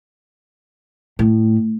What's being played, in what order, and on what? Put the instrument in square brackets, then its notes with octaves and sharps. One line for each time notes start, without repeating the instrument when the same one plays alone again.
[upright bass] A2